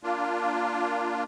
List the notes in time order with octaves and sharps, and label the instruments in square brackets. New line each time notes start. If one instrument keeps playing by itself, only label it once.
[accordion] A#3 D4 F4